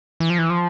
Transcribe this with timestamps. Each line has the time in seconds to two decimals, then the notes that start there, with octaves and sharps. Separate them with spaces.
0.20 E3
0.30 F3
0.39 E3
0.50 F3